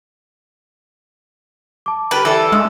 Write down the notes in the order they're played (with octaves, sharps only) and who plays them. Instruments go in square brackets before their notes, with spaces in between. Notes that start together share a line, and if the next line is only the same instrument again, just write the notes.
[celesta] A5 D6
[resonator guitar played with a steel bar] G3 G4 A#4 [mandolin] B4
[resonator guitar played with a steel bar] E3 G3 [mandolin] A4
[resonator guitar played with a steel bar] G2 [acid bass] G#3